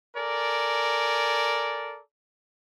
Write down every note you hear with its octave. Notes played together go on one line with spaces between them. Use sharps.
A4 A#4 D5 G#5